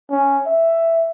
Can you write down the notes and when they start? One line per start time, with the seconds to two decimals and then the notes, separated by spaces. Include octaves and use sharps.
0.10 C#4
0.46 E5